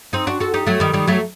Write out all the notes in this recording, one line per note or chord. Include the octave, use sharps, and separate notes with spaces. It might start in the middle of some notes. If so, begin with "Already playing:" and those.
C4 D#4
D4 F#4
F#4 A4
D#4 G4
F#3 A3
D#3 G3
D#3 G3
F#3 A3